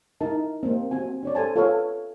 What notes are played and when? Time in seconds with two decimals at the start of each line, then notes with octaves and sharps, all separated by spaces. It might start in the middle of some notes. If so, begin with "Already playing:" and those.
0.21 D#4 E4 A#4 A5
0.63 A#3 C4
0.91 C4 F#4 G#5
1.23 D4 C#5 D5
1.35 A4 C5 G#5 A5
1.56 F4 A4 B4 C#5 F5